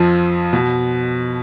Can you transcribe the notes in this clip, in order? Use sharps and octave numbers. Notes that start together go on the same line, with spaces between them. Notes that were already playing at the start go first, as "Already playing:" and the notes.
Already playing: F2 F3
B2